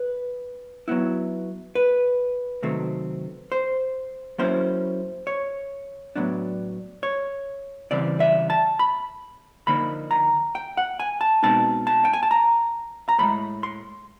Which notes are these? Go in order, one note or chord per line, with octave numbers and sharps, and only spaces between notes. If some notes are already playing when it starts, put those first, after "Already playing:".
Already playing: B4
F#3 B3 E4
B4
C3 D#3 F#3 A3 C4
C5
F#3 A#3 C#4 E4 C5
C#5
A2 F#3 B3 D4
C#5
C#3 E3 G3 C4 D5
E5
A5
B5
D3 F3 A#3 D#4 B5
A#5
G5
F#5
G#5
A5
B2 G#3 C4 D#4 A5
A5
G5
G#5
A5
A#5
A#5
A2 F3 G#3 B5
C6